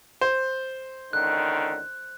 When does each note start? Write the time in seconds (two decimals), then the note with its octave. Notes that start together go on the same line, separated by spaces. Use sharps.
0.21 C5
1.13 C#2 D3 D#3 F#6